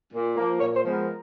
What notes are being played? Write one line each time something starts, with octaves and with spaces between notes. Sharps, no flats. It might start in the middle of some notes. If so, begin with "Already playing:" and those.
A#2
F3 A#3
A#2 C#5
C5
F3 G#3 B3
A#4